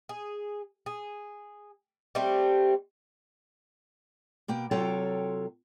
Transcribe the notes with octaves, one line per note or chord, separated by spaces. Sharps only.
G#4
G#4
G3 A3 C4 G4
B2 A#3 G5
C3 F#3 F4 A4 C#5 G5